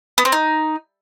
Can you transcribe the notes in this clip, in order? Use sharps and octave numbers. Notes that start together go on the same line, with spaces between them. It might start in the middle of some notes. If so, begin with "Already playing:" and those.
B3
C4
D#4